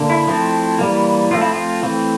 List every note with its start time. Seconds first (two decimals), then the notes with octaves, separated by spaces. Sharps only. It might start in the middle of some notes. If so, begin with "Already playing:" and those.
Already playing: D3 A#3
0.10 E4
0.27 F3 A3 C4
0.79 E3 G3 A#3
1.31 F3 A3 C4 F4
1.41 E4
1.53 F4
1.83 E3 A3 C4